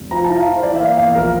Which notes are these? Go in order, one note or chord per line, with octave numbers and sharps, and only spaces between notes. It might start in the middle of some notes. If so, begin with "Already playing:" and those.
Already playing: F1
F3 A#5
E4 A5
F5
E4
C5
E3 D5
E5
A#3 F5
E2 F5
A#1 A#4